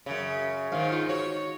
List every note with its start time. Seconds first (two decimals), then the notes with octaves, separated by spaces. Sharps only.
0.06 F#2 C#3
0.72 G#2 D#3 F5
0.91 F4
1.09 F#4 C#5